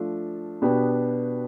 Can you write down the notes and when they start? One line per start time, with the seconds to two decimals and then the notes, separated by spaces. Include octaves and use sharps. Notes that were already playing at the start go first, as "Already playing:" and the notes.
Already playing: F3 A3 D4 F4
0.62 B2 B3 D4 G4 B4